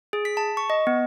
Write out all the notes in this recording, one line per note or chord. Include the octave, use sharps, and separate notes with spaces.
G#4
B6
A5
C#6
D#5
B3